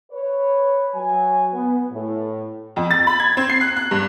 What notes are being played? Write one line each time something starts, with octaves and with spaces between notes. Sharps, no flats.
B4 C#5
F#3 G#5
B3
A2
F2
A6
B5
G#6
C4
C7
F#6
F#6
G2